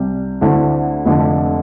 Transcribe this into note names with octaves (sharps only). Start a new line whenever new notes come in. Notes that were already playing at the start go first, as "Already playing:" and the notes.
Already playing: C2 C3 G3
D2 D3 A3 C4 E4
F1 F2 D3 F3